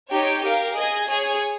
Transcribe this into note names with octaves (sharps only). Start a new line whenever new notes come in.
D#4 G4 C#5 G5
G4 A#4 F5
G#4 D#5 G#5
G#4 C#5 G#5